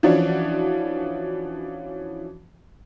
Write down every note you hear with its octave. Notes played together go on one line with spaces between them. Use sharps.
E3 F3 C#4 D4 F#4